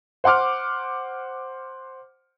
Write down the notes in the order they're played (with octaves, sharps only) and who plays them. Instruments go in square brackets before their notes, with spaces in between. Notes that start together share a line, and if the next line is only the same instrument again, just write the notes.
[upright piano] C5 F#5 C6 D6 F6